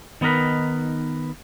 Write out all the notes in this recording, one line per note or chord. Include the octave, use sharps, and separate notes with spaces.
D#3 B3 D#4 A#4 B4